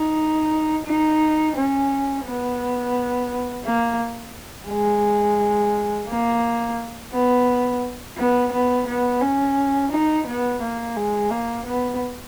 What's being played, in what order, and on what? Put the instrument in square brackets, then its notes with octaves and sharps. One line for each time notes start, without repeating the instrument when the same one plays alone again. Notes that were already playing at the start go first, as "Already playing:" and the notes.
Already playing: [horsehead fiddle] D#4
D#4
C#4
B3
A#3
G#3
A#3
B3
B3
B3
B3
C#4
D#4
B3
A#3
G#3
A#3
B3